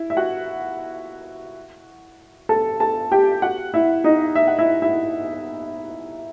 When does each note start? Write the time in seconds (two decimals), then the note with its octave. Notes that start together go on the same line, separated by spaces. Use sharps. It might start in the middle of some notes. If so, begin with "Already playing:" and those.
Already playing: E4
0.10 E5
0.17 F#4 F#5
2.49 A4 A5
2.80 A4 A5
3.12 G4 G5
3.42 F#4 F#5
3.74 E4 E5
4.04 D#4 D#5
4.35 E5
4.47 F#5
4.59 E4 E5
4.82 E4 E5